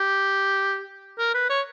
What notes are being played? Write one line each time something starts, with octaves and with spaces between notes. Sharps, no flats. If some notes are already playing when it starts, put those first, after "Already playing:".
Already playing: G4
A#4
B4
C#5